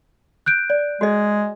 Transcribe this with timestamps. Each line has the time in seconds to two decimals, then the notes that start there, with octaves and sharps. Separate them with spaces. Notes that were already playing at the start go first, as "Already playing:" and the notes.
0.46 F#6 G6 D7
0.70 D5
1.01 G#3 F#4 G#4 D#5